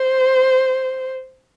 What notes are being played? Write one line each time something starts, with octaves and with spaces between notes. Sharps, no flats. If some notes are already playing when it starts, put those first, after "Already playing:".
Already playing: C5